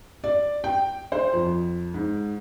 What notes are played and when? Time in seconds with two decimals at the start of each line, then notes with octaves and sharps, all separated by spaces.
0.24 D5
0.64 G5
1.12 C5
1.33 F2
1.94 G#2